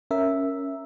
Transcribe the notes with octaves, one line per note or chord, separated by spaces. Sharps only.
C#4 A#4 E5